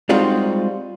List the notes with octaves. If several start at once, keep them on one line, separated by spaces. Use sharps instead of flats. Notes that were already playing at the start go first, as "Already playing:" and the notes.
G3 G#3 C4 D#4 F4 F#4